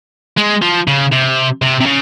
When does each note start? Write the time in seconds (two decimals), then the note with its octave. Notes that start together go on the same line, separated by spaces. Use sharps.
0.37 G#3
0.62 F3
0.87 C#3
1.12 C3
1.62 C3
1.81 C3
1.86 C#3